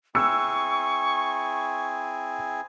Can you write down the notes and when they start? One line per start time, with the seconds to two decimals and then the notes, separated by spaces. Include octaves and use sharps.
0.15 C4 E4 G#4 C#6 E6 F#6 C#7